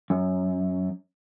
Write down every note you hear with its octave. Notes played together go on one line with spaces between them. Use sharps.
F#2